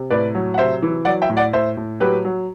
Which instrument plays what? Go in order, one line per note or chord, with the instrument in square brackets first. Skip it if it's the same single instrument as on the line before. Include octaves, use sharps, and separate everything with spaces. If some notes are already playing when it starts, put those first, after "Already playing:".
Already playing: [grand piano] C3
A2 B4 D5
F#3
F#5
C3 C5 E5
E3
F#3 D5 F#5
E5 G5
A2
D5 F#5
A2 C5 E5
A2
F#3 G4 B4
F#3